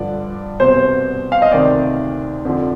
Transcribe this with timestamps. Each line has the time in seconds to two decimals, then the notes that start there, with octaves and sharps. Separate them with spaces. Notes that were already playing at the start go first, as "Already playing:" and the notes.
Already playing: G2 D3 F3 D5
0.60 C2 B2 C5
1.32 F5
1.42 D#5
1.52 D2 C3 D#3 D5
2.45 F2 D3 F3